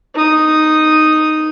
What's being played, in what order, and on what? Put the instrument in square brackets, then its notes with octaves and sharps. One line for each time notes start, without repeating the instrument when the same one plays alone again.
[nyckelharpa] D#4 D#6